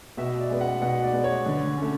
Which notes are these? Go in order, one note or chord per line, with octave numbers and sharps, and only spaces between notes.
B2 E5
D5
G#3 B3
F#5
B2 F#5
D5
G#3 B3
C#5
D3
A3 C#4